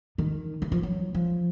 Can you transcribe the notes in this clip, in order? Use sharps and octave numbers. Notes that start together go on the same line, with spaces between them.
D#3
E3
F3
F#3
F3